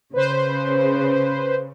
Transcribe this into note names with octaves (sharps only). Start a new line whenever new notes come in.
C#3 B4 C5